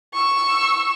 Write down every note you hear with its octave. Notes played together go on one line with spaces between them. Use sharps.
C#6 E6